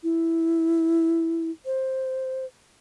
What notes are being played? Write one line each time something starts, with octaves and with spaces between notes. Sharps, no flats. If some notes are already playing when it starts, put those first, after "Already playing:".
E4
C5